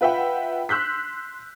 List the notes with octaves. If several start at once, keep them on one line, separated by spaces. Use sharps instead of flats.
F4 B4 E5 F#5 G5
C6 E6 F#6 G6 B6